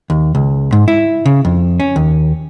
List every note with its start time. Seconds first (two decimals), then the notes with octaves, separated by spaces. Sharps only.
0.10 D#2
0.35 C#2
0.72 G#2
0.88 E4
1.26 C#3
1.45 F2
1.80 C#4
1.96 D#2